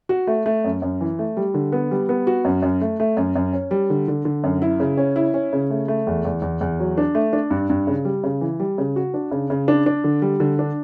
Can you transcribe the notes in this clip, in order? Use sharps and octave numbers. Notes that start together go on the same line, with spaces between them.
F#4
A3
A3
F#2
F#2
E3
A3
G3
D3
B3
G3
B3
F#4
F#2
F#2
A3
A3
F#2
F#2
C#4
G3
D3
D3
D3
F#2
E4
C#3
C#4
E4
C#4
C#3
A3
A3
E2
E2
E2
E2
F#3
D4
A3
D4
G2
G2
C#3
G3
C#3
E3
G3
C#3
F#4
D4
C#3
C#3
D4
D4
D3
G3
D3
D4